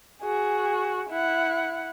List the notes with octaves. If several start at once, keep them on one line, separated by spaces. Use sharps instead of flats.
F#4 G#4
E4 F#5